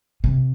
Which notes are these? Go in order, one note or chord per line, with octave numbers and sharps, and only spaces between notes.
C3